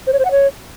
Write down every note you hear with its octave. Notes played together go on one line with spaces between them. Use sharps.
C5
C#5
C5
F#5
C#5